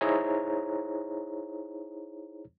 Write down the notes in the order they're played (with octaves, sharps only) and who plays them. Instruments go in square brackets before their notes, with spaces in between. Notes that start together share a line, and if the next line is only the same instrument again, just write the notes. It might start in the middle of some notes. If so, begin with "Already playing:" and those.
[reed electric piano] D#4 E4 G#4 C5 C#5 A#5